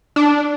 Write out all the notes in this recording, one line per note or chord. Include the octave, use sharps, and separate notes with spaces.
D4